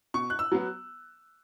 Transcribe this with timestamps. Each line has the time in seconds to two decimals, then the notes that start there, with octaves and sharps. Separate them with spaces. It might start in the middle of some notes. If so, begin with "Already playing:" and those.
0.14 B2 C#6
0.30 F#6
0.39 E6
0.52 F#3 B3